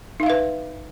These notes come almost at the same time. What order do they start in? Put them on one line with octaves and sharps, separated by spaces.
D#4 F5 E5 B4